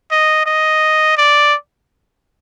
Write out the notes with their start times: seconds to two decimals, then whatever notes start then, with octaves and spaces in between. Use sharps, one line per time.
0.11 D#5
0.46 D#5
1.18 D5